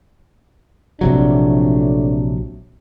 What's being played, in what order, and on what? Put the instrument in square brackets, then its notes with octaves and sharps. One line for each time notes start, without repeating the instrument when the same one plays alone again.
[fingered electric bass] A#1 C3 F#3 [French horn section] F2 A2 D4